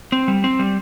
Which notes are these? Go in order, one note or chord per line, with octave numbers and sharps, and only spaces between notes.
C4
G3
C4
G3